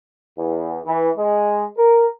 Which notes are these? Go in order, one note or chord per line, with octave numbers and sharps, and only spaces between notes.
E2
E3
G#3
A#4